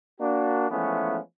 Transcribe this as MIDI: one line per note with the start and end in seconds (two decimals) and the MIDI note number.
0.20 0.69 58
0.20 0.69 62
0.20 0.69 66
0.70 1.17 52
0.70 1.17 53
0.70 1.17 56
0.70 1.17 57
0.70 1.17 59
0.70 1.17 61